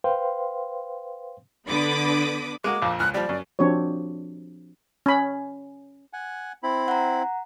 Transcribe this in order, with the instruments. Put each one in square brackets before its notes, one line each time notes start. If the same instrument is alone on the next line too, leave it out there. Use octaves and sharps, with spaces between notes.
[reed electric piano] B4 C5 F5 G5 C6
[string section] D3 B3 B5 D6 D#6
[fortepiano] G#3 A#3 F#4 [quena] D6
[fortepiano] A#1 F2 A#2
[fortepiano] C#2 F6 [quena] F#6
[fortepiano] F3 G3 [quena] D5
[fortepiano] F#2
[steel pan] F3 C4 D4 F#4 C#5
C#4 B5
[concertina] F#5 G#5
C4 E4 B5
[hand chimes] F#5 A#5